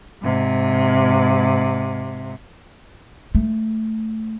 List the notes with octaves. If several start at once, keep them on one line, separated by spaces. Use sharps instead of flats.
G#2 C3
A3